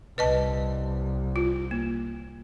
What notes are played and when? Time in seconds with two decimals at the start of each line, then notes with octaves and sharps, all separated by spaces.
0.18 C2 B4 D#5 A5
1.36 F4
1.71 A#3